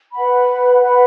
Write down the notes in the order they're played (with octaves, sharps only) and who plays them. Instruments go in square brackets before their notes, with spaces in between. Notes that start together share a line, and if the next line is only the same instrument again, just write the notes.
[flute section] B4 F#5 B5
B4 F#5 B5